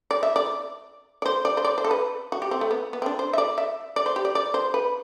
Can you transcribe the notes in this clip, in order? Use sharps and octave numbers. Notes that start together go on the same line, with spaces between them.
D5
E5
D5
D5
C5
D5
C5
D5
C5
A4
B4
F#4
G4
C4
A3
B3
B3
C4
D4
C5
E5
D5
E5
D5
C5
G4
D5
D5
C5
B4